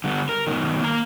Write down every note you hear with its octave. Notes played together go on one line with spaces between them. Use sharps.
D3 G3 B3
A#4
G2 B2 D#3
A#3 A#5